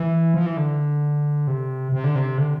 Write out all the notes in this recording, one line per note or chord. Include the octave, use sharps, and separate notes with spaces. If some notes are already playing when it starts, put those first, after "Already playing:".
Already playing: E3
F3
E3
D3
C3
C3
D3
C3
D3